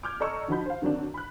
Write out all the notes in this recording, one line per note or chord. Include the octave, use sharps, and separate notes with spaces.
D6 F6 G6 G#6
A4 D5 D#5 A#5 C#6 E6
D3 F3 D#4 F#4 B5 G6
C5 F5
D3 D#3 F#3 C4 D4
B5 F#6